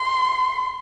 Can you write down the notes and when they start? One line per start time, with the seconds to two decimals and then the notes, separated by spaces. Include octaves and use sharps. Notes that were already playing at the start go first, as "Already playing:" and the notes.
Already playing: C6